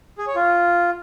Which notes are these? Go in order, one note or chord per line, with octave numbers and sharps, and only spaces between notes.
G#4
C#5
F4